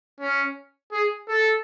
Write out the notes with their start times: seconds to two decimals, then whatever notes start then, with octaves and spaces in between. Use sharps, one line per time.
0.20 C#4
0.92 G#4
1.28 A4